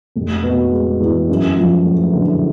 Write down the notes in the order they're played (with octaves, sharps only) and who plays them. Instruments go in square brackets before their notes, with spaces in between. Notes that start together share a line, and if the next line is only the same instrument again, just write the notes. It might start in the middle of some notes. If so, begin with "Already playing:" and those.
[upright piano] F1
B2
G#3
E2
F#2
F3
A3
D3